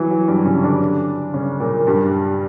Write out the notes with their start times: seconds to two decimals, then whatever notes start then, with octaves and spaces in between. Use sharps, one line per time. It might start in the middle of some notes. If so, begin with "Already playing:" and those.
Already playing: E3 F#3
0.10 F#3
0.28 G2 G3
0.45 C#3 C#4
0.64 D3 D4
1.34 C#3 C#4
1.60 A#2 A#3
1.87 G2 G3